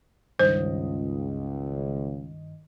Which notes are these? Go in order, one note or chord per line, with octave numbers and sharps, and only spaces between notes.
C#2 G2 D#3 C5 D#5